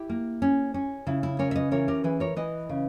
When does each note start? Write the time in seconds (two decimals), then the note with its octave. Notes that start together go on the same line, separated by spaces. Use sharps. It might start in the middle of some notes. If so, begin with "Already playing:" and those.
Already playing: E4 G4
0.09 A#3
0.42 C#4
0.74 C#4
1.07 C#3 E4
1.23 E4
1.39 C#4 A#4 C#5
1.51 E5
1.56 B4 D#5
1.71 E3 A#4 C#5
1.88 G4 A#4
2.04 E3 G#4 B4
2.20 A#4 C#5
2.36 E3 B4 D#5
2.69 C#3